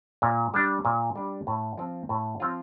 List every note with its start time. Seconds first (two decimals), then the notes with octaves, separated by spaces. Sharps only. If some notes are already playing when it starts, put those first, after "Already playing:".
0.22 A#2
0.54 G3 D4
0.85 A#2
1.16 G3 D4
1.47 A2
1.78 F3 C4 F4
2.09 A2
2.40 F3 C4 F4